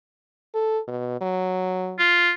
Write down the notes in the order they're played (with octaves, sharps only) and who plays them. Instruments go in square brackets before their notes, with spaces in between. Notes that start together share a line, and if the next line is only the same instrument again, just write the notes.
[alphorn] A4
B2
F#3
[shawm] F4